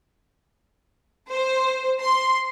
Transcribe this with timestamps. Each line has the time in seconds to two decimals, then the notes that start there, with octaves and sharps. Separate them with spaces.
1.30 C5
2.01 C6